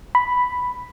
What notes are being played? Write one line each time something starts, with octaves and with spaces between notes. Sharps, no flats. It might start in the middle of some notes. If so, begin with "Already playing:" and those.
B5